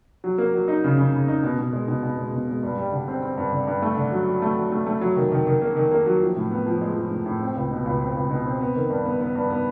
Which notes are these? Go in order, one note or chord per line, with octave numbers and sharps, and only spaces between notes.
F#3
A#3
F#3
D#4
C#3
C#3
C#3
D#4
B2
B2
G#3
B2
B2
G#3
B2
G#3
G2
G3
D3
C4
C4
G2
D3
G2
A3
D3
F#3
F#3
A3
F#3
A3
A3
F#3
D#3
D#3
D#3
A#3
D#3
A#3
F#3
F3
A2
B3
F3
G#3
F3
A2
A2
C4
C#2
B2
C#2
C4
C#2
B2
C4
B3
D#3
G2
B3
B3
G2
B3